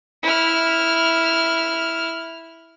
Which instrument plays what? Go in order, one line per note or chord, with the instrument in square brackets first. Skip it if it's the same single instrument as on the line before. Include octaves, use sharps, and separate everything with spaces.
[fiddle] E4 F6